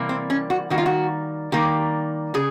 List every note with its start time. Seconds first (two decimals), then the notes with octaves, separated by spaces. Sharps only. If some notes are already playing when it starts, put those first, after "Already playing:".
Already playing: C3 E3 G3 A#3
0.09 C4
0.30 C#4
0.50 F#4
0.70 D#3 G3 A#3 F#4
0.78 F4
0.86 F#4
1.52 D#3 G3 A#3 G4
2.34 C#3 G#4